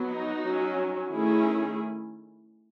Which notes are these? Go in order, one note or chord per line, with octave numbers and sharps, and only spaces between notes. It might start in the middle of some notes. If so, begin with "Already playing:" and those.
Already playing: F#3 B3
D#4 F#4
F#3 C#4
D#3 A3 C#4 E4 G#4